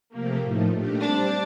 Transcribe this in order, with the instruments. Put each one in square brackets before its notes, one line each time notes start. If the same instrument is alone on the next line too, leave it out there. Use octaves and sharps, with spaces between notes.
[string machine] C3 F3 A3 C4 G4 [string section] A#3
[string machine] A2 F3 A3 D#4
A#2 A3 D4 G4 A#4
[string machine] G3 C4 G4 C5 [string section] D4